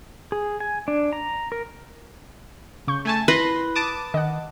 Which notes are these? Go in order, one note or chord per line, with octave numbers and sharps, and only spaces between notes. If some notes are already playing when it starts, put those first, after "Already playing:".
G#4
G#5
D4
A#5
A#4
C#3 C#6 G6
A3 G#5 A5
E4 B4 B5 C6 A#6
A5 D6 D#6
D#3 D#5 F#5